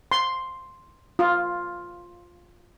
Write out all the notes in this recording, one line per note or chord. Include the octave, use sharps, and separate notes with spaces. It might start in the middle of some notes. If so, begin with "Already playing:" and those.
C6
F4